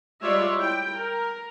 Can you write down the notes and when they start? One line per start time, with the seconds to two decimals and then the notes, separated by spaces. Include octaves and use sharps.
0.21 G3 G#3 F4 C#5 D5 E5
0.56 E4 G5
0.92 A#4